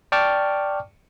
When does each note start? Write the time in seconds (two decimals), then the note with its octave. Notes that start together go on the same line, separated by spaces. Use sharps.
0.12 D5 G5 A5 C#6 D6 F6